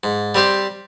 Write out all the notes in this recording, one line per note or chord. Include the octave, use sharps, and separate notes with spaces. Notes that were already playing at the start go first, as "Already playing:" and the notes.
G#2
G3 C4 G4 C5